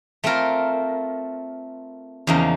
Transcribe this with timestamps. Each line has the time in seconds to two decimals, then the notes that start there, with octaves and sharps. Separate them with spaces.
0.24 A3 C4 F4 A#4
2.27 E2 C#3 F3 A#3 D#4